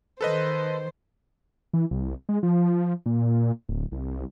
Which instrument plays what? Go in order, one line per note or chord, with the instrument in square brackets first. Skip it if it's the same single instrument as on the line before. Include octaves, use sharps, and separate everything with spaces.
[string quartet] D#3 C5 [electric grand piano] A4 B4 D#5
[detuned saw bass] E3
C2
G#3
F3
A#2
D1
C2